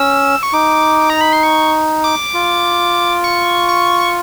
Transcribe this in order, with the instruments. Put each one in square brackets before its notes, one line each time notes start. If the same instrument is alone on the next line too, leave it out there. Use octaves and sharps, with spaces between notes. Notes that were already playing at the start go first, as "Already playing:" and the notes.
Already playing: [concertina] C#4 [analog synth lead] E6
[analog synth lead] C#6
[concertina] D#4 [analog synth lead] D6
[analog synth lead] A#5
B5
C6
C#6
D6
[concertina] F4
[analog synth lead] C#6
C#6